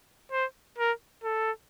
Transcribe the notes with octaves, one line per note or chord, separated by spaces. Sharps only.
C5
A#4
A4